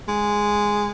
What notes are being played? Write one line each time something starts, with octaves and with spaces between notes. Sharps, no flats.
G#3